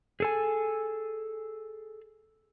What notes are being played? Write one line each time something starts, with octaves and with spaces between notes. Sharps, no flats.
G#4 A4 G#5